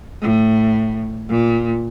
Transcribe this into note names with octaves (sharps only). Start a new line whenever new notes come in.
A2
A#2